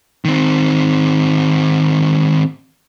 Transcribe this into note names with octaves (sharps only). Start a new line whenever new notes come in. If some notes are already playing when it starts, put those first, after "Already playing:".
D#3 C4